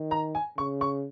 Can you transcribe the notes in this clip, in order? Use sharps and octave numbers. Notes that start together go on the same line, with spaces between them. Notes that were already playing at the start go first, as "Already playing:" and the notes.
Already playing: D#3
A#5
G#5
C#3 C#6
C#6